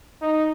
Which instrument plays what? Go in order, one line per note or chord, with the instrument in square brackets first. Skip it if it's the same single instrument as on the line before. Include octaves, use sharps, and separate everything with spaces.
[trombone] D#4